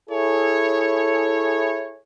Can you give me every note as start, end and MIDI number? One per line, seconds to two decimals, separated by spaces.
0.10 2.00 64
0.10 2.00 68
0.10 2.00 69
0.10 2.00 73